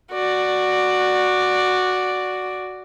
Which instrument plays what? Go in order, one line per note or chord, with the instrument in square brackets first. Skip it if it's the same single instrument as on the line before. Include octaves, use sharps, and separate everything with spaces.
[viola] F#4 D5